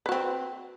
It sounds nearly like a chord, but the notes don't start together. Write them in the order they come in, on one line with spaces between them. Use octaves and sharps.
B4 F#4 C4